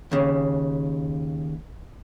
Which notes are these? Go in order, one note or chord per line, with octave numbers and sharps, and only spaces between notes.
D#2 C#3